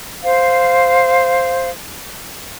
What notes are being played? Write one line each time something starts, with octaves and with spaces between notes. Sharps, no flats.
C5 F5